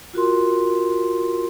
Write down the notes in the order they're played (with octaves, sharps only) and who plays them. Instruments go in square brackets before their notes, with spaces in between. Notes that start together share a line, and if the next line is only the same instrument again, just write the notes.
[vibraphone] F4 F#4 A#4 C6